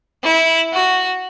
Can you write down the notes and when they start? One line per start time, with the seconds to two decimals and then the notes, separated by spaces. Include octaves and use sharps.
0.23 E4
0.73 F#4